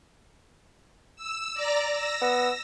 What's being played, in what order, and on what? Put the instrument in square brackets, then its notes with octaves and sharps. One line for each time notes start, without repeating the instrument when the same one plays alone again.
[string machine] E6
D5 A#5 A#6
E6 A#6
[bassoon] B3